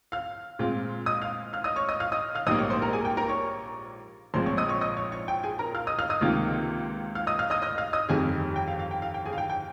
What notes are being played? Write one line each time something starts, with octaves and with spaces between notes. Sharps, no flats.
F5 F6
A#2 G#3 C4 F4
D#5 D#6
F5 F6
F5 F6
D#5 D#6
C#5 C#6
D#5 D#6
F5 F6
D#5 D#6
F5 F6
A#1 G#2 G3 A#3 D#5 D#6
C#5 C#6
C5 C6
A#4 A#5
G#4 G#5
G5
A#4 A#5
C#5 C#6
A#1 A#2 F3 G#3 C4 C5 C6
C#5 C#6
D#5 D#6
C#5 C#6
D#5 D#6
C#5 C#6
C#5 C#6
G5
G#4 G#5
A#4 A#5
F5 F6
D#5 D#6
F5 F6
D#5 D#6
C#2 C3 D#3 A#3 F4
F5 F6
D#5 D#6
F5 F6
D#5 D#6
D#5 D#6
F5 F6
D#5 D#6
G1 F2 D#3 G3 C4 G#4 G#5
G5
F5
F5
G5
F5
G5
G#4 G#5
F5
G5
G5